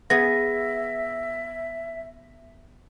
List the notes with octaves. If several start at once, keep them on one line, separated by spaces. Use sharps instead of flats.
B3 G#4 E5 A#6